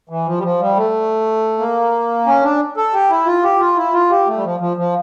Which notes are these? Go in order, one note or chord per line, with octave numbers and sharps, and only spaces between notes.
E3
F3
G3
F3
G3
A3
A#3
C#4
D4
A4
G4
E4
F4
G4
F4
E4
F4
G4
A3
G3
F3
F3
F3